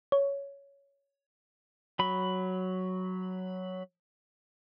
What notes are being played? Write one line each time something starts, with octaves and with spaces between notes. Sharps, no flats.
C#5
F#3 B5